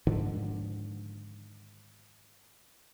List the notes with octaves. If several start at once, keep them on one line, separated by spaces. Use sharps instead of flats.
G#2 D3 D#3 F3